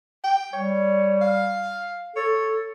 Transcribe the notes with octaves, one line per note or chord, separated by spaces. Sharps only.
G5
G3 C#5
F5
A4 C#5